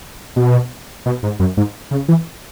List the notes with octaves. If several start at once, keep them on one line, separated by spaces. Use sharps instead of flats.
B2
B2
G#2
F#2
G#2
C#3
E3